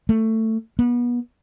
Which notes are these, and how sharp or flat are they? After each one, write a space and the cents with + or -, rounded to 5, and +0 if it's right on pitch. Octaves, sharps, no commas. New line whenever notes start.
A3 +15
B3 -30